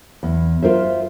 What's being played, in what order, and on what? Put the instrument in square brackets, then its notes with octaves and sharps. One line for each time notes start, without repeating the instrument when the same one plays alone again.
[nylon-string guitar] E2
F4 A#4 C5 E5